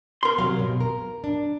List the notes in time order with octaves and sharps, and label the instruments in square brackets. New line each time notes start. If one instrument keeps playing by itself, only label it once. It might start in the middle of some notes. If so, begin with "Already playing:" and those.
[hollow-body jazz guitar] A#4 C6
[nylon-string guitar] C3 F#3 [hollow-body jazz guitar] F5
[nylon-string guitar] B2
A#4
D4